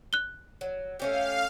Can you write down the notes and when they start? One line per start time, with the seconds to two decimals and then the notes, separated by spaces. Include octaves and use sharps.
0.13 F#6 G7
0.61 F#3
1.00 A3 C#4 G4 F5